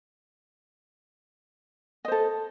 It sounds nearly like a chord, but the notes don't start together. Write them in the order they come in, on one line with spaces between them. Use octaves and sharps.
D#5 C5 A4